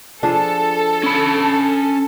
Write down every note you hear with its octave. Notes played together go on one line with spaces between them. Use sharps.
F3 D4 G#4 A4
C#4 B5